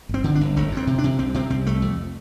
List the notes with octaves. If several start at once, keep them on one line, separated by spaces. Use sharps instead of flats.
G1 C4
D3
D4
G1
G1 A3
F2
C4
C3
D4
C3
C2 C4
C3 C4
C2 C4
C2 A3
F2